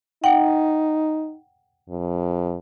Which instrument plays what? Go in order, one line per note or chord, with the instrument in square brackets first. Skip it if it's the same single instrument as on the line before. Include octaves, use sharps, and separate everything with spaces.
[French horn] D#4 [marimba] F#5 G5
[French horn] F2